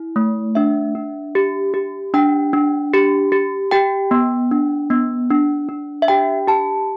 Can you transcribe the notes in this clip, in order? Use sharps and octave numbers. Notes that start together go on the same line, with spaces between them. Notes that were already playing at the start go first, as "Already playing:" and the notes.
Already playing: E4
A3
D4 E5
D4
G4
G4
D4 G5
D4
G4
G4
G4 G5
B3
D4
B3
D4
D4
E5
G4 G5
G4 A5